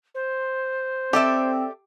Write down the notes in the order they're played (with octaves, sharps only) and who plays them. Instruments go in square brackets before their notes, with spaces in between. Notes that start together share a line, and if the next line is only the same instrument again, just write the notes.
[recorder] C5
[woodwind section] C4 [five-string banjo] G4 [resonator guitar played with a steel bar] A4 D5 E5